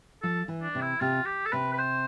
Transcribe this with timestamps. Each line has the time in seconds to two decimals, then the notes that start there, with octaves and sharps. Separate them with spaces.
0.23 F3 A4
0.48 E3
0.62 D4
0.75 C3
0.81 E4
1.01 C3 F4
1.26 G4
1.46 A4
1.52 C3 B4
1.73 B4
1.78 C5